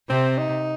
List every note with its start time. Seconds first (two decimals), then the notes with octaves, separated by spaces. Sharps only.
0.09 C3 C4
0.38 D#4